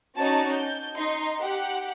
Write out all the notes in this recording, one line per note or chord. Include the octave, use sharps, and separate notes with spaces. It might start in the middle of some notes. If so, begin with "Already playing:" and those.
C#4 D#4 F#4 C#5 D5 A5
G6
D#4 C6
G4 F#5